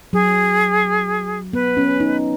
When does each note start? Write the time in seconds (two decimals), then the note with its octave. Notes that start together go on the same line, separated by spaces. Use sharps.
0.13 F#3 G#4
1.53 B3 B4
1.77 C#4
2.00 D#4